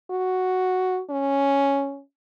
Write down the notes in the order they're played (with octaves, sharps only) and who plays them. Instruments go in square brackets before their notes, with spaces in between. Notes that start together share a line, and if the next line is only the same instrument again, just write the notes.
[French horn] F#4
C#4